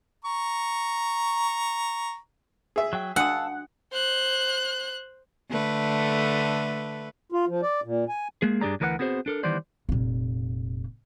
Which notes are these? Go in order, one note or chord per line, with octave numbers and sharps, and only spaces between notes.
A#5 C#6
G#4 E5
F#3 G5
D4 F#4 F5 F#5 A5 D#6 E6
C5 F#6
D3 A3 B4
F4
F3
D5
A#2
G#5
G#3 A#3 G#4
G2 D4 G4 G#4 D5 A#5
D2 E3 A#4 B4 D5 F#5
B3 C4 F#4 G#4 C5
D4 A4 A#4
D#3 E3 G3 B3 C5 D5
F1 A#2